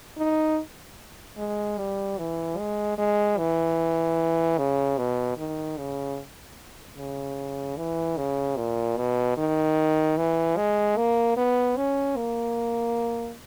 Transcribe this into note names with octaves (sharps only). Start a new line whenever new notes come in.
D#4
G#3
G3
E3
G#3
G#3
E3
C#3
B2
D#3
C#3
C#3
E3
C#3
A#2
B2
D#3
E3
G#3
A#3
B3
C#4
A#3